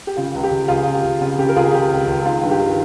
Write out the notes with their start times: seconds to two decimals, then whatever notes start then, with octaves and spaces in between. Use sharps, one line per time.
0.07 G4
0.17 C#3 F4
0.35 C#2
0.44 G4
0.51 C#2
0.68 C#2 F4 G#4
0.86 C#3
0.95 G4
1.04 C#2
1.21 C#3 F4
1.38 C#3 G4
1.49 A#4
1.56 C#2 F4 G#4
1.74 C#3 G4
1.91 C#2
2.07 C#2
2.26 D#3 F4
2.43 G2
2.51 G4
2.60 D#3